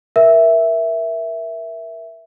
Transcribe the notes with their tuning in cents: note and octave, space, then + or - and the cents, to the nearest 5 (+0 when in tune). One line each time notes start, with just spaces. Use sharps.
A#4 +20 E5 +0